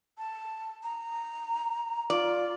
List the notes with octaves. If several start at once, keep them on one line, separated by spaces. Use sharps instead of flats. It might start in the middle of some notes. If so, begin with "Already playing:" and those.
A5
A#5
F4 D5